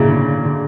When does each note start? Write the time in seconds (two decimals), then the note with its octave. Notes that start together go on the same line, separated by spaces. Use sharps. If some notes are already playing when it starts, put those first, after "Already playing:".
Already playing: A#2 C#3 E4
0.08 D3
0.45 D3